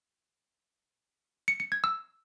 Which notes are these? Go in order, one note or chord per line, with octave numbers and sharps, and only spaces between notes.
C#7
C#7
G#6
E6